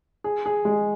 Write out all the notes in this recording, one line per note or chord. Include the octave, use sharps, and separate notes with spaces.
G#4
G#4
G#3